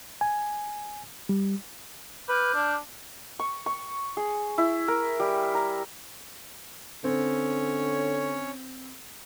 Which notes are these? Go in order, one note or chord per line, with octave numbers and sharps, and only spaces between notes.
G#5
G3
B4 D6 F6 G6
D4
C#6
C#6
G#4
E4
A#4
G3
A#5
D3 C4 C#4 C#5